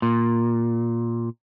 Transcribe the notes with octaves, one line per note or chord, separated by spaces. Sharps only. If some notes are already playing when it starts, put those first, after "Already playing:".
A#2